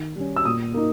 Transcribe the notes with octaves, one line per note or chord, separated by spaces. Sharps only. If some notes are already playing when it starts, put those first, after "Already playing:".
Already playing: D#3
G3 C#4
E6
A#2 D#6
A#3 D#4